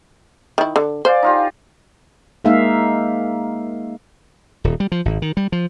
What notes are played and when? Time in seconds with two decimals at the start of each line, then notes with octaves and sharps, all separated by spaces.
0.58 D#3 E4
0.76 D3
1.05 C5 D5 F5 G#5
1.23 D#4 F4 G4
2.44 G#3 A#3 D#4 G#4 E5 F5
4.64 D#1
4.80 G3
4.92 F3
5.05 G#1
5.22 D#3
5.37 G3
5.52 F3